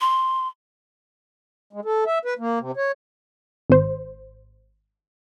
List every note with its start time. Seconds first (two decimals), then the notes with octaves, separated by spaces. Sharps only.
0.01 C6
1.73 G#3
1.85 A4
2.06 E5
2.25 B4
2.39 A#3
2.60 C3
2.77 C#5
3.70 G#1 C5